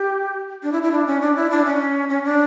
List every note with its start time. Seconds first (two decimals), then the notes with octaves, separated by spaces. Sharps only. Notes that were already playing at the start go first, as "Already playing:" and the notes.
Already playing: G4
0.63 D4
0.72 E4
0.82 E4
0.92 D4
1.06 C#4
1.21 D4
1.36 E4
1.50 D4
1.65 C#4
2.09 C#4
2.24 D4